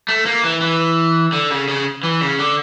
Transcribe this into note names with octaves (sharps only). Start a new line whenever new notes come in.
A3
A#3
E3
E3
D3
C#3
C#3
E3
C#3
D3